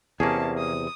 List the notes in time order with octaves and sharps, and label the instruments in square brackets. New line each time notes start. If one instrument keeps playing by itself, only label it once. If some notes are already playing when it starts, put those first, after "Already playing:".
[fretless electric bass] E2 C3 [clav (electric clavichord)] A#3 C#4 G#4 [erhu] A5
[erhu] D#6